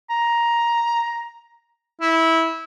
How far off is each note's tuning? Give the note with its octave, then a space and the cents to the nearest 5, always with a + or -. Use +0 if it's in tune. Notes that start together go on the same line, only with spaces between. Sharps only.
A#5 +10
E4 -15